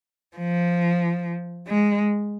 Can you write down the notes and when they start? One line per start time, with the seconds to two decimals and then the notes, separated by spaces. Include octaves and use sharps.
0.37 F3
1.67 G#3